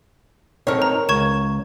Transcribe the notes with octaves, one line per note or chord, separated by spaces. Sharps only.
C4 D#4 A4 A#4 C#5
A#5
C#2 C#6 G#6 E7